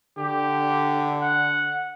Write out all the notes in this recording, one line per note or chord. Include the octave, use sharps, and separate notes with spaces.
D3 G4
F#5